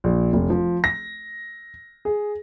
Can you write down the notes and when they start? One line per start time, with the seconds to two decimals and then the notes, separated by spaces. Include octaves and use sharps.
0.04 A#1
0.33 F1
0.50 F3
0.84 A#6
2.05 G#4